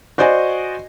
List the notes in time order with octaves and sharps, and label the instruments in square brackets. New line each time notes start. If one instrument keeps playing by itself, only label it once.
[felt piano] F#4 C5 D5 D#5 G#5